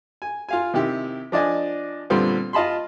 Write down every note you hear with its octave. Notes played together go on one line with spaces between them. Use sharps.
G#5
F4 F5 G#5
C3 D#3 E4 G4
F3 D4 D5 D#5 G#5
A#2 D3 G3 B3 C4 F4
F4 D#5 A5 B5 C6